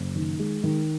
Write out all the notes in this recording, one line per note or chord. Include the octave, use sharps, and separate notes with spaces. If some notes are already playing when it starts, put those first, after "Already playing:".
Already playing: F#1
D#3
G#3
D#3